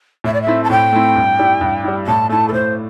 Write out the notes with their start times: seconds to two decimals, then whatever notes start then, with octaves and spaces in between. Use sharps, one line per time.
0.24 A2 E5
0.33 D5
0.41 E5
0.47 A3 C4 E4
0.63 A5
0.70 A2 G5
0.93 A3 C4 E4
1.15 G2
1.39 G3 E4
1.61 G2
1.84 G3 E4
2.06 A2 A5
2.29 A3 E4 A5
2.48 A4
2.52 A2 C5